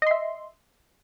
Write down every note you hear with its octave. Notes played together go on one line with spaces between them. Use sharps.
D#5 E5 C6